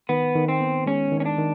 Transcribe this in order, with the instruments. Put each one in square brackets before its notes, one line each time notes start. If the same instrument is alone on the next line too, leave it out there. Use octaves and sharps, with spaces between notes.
[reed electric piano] D#3 [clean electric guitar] B3
[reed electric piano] D#3
[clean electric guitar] C4
[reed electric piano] B3
[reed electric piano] G#3 [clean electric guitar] C#4
[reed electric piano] D#3
[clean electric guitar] C#4
D4
[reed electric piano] D#3